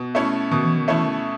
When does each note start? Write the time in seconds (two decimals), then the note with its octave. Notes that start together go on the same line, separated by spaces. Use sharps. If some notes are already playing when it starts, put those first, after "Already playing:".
Already playing: B2
0.15 A3 C#4 E4
0.51 B2 D#3
0.64 E3
0.77 D#3
0.88 E3 A3 C#4 E4
1.03 D#3